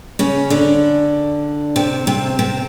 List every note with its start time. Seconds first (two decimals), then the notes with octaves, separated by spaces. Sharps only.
0.19 C#3 C#4
0.50 D3 D4
1.76 C3 C4
2.07 C3 C4
2.39 C3 C4